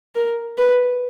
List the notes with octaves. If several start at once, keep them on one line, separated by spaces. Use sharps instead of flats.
A#4
B4